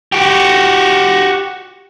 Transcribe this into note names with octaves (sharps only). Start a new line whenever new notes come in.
F#4 G4